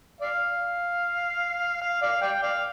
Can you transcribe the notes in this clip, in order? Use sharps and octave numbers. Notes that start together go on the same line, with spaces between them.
D5 F5
F5
D5 F5
D5 G5
D5 F5